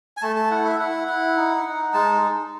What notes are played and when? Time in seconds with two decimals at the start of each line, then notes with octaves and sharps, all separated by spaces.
0.17 G#5
0.22 A3 A5
0.36 A5
0.51 E4 F#5
0.65 E5
0.79 E4 F#5
1.08 E4
1.37 D#4
1.65 D#4
1.93 G#3 A5